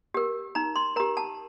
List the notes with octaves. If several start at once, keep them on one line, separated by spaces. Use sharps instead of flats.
G4 A#4
D#4 A#5
C6
G4 A#4 A#5
A5